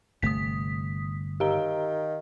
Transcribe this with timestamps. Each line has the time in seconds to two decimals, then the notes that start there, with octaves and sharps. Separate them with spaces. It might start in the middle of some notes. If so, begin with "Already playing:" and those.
0.22 G1 C3 A3 D#6 B6
1.40 D#3 G4 F5 A#5